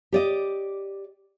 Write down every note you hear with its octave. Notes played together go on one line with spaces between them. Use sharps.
G4 D5 D#5